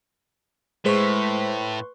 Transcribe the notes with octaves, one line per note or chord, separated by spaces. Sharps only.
A2 G#3 B4 C5 C6 C#6 B6